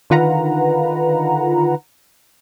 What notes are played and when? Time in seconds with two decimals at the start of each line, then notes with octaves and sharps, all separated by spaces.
0.10 D3 D#3 F4 B4 F#5 A#5